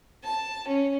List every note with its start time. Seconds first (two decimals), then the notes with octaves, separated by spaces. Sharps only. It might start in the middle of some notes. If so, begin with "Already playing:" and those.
0.24 A5
0.68 C#4